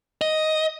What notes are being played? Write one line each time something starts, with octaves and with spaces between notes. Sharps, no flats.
D#5